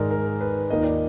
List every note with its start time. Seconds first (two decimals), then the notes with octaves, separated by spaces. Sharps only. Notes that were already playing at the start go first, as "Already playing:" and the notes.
Already playing: G#2 D#3 G#3 D#4 A#4 D5
0.11 A#4
0.41 B4
0.70 D#2 D#3 A#3 F4 D#5
0.83 D5